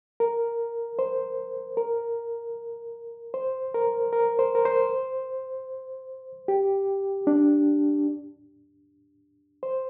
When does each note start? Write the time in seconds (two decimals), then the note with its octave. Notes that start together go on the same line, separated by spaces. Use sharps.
0.20 A#4
0.99 C5
1.77 A#4
3.34 C5
3.74 A#4
4.13 A#4
4.39 C5
4.55 A#4
4.65 C5
6.48 G4
7.27 D4
9.63 C5